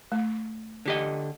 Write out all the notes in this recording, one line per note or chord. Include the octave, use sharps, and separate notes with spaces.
A3
D3 G4 D#5